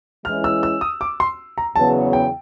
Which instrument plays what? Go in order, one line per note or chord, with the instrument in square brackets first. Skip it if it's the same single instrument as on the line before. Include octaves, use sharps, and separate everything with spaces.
[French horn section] E3 G#3 C#4 E4 [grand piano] F6
[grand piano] E6
E6
D#6
D6
C6
A#5
[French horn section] E2 C#3 F#3 B3 [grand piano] A5
[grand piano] G5